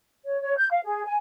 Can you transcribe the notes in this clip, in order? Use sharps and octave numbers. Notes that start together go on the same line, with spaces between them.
C#5
C#5
G6
F5
G#4
G#5